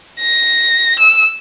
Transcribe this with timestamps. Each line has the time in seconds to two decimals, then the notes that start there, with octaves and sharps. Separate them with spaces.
0.20 A#6
0.99 E6